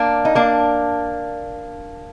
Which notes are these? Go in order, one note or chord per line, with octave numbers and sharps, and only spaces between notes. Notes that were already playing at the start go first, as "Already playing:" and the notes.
Already playing: A#3 D4
D#4
A#3 D4